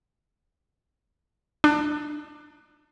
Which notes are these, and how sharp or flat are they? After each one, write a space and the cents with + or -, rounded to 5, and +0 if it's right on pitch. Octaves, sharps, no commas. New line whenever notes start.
D4 +25